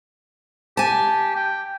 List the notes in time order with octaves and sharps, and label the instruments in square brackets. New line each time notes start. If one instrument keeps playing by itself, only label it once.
[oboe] G4 [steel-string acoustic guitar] G#5 A5
[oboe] G5